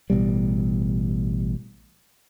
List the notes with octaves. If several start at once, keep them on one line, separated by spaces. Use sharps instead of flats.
A1 B2 G3